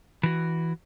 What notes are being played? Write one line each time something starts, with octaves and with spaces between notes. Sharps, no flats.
E3 F#4